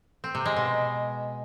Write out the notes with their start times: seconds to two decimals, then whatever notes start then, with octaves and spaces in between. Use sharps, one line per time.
0.24 C4
0.35 C3
0.46 G#3
0.56 B2